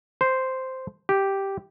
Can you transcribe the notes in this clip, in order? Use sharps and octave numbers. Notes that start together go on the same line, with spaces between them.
C5
G4